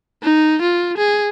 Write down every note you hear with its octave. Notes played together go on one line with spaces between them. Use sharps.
D#4
F4
G#4